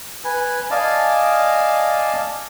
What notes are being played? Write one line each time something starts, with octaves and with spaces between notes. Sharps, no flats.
B4 G#5
D5 D#5 F5 G#5 A5